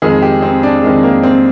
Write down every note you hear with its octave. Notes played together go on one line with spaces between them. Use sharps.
F2 D#3 G#3 G#4
G4
C4
D4
F2 D#3 G#3
A#3
C4